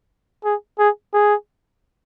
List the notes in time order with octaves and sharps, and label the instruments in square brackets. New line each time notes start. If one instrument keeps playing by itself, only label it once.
[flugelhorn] G#4
G#4
G#4